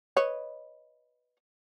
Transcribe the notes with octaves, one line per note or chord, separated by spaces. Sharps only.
B4 C#5 D#5